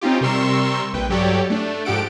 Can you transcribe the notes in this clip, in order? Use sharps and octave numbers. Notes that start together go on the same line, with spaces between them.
C4 C#4 D#4 F4 G4
C3 G3 A#4 C6 C#6 E6
A#1 B4 G5
G2 F#3 G4 A4 C#5 D5
A3 D4
G#2 F3 G4 A4 F#5 D7